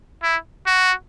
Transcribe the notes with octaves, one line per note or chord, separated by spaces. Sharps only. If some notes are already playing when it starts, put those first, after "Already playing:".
E4
F#4